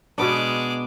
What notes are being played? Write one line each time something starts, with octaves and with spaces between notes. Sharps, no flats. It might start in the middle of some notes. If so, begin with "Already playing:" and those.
B2 G#3 B3 D4 D6